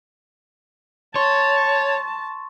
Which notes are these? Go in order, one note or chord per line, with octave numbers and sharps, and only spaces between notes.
C#5 A5 C6 C#6